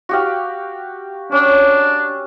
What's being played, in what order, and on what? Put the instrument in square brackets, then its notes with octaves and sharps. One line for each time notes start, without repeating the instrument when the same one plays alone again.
[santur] F#4 G4 F5
[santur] C#4 [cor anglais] D4